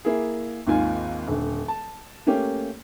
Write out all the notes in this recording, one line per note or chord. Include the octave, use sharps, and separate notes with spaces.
A#3 E4 G#4
G#1 D#2 D#3 F4 G#5
D#1 D3
A5
A3 A#3 C#4 G4